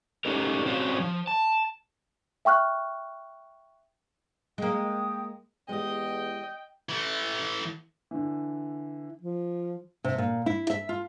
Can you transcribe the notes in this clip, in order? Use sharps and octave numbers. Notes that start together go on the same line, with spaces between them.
A3 C#4 D#4 G4 A#4
G3 C4 C#4 F4 F#4 C5
F3
A5
E5 G5 C#6 F6 F#6
G#3 A#3 G5 D#6
E2 G#3 G4 D#5 G5
E3 A3
D3 E3
F3
C3
A#2
E4
E5
F4